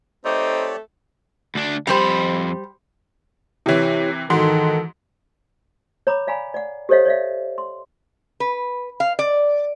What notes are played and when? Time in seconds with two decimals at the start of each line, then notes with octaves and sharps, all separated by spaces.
0.25 A3 C4 D#4 G4 A4 C#5 D5
1.55 D2 D4
1.87 F2 G3 G4 C5 B5
3.66 C3 E3 E4 G4 C#5
4.30 G#2 D#3 E3 F#4 A4 C6
6.07 C#5 A#5 B5 D6
6.27 D5 F5 G#5 A#5 B5
6.54 D5 F#5
6.89 G4 A4 C5 C#5 D#5 F5
7.05 C#5 D5 E5 F5
7.58 C6
8.40 B4
9.00 F5
9.19 D5